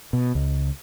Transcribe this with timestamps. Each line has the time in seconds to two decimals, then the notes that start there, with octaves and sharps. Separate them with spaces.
0.13 B2
0.35 C#2